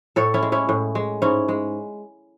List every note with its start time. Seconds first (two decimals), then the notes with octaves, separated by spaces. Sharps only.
0.16 A2 A4 C#5
0.34 C#4 E4
0.42 G#3
0.52 C#4 E4
0.69 A2
0.95 G#3
1.22 G#2 C#4 E4
1.48 G#3